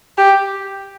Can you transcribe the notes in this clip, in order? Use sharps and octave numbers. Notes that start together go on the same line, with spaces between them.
G4